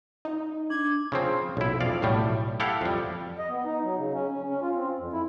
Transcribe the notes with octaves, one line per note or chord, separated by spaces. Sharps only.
D#4
D4 G#6
C#3 F3 C4
B1 E4
F2 D5 F5
B1 A2 G3
E4 G4 A4 F5 F#5
F2 G3
D#5
B3
D#4
F#3
C#3
C#4
C#4
C#4
F4
C4
F2
E4